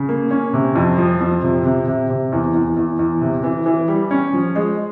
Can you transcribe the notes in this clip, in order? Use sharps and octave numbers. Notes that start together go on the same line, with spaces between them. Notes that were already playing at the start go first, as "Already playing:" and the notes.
Already playing: C#3
A#3
C#4
C3
F2
F3
F2
C3
C3
C3
C3
E2
E2
E2
E2
C3
E3
E3
G3
C#4
F3
G#3